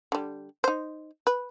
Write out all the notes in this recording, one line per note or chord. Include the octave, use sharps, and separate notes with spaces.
D3 G3
D#4 C5
B4